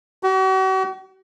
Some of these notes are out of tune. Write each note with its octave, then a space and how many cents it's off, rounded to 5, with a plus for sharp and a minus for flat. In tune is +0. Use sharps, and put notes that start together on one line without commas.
F#4 +45